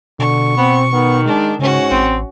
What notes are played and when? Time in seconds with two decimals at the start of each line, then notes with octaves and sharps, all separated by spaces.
0.19 B2 D3 C#6
0.58 B3 C4
0.92 D#3 B3
1.26 G#3 D4
1.59 G#2 C#3 C#4 F#4
1.91 A1 C4